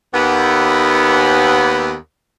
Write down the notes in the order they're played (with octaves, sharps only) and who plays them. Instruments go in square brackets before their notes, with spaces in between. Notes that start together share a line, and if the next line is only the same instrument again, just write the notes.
[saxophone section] D#2 B3